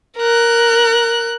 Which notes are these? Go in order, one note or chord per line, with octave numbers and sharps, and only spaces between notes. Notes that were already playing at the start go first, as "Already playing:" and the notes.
A#4 F#6